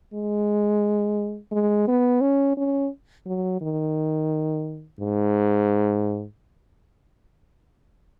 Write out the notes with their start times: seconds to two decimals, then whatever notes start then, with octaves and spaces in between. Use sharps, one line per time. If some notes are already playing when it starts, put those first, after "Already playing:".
0.14 G#3
1.52 G#3
1.87 B3
2.21 C#4
2.57 C#4
3.26 F#3
3.61 D#3
5.00 G#2